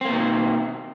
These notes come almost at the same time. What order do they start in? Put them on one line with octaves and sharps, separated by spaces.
C4 A#3 B2 D#3